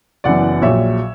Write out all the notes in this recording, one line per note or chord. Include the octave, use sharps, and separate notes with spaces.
F#1 F#2 E3 B3 D5 F#5
A#1 A#2 F#3 C#5 E5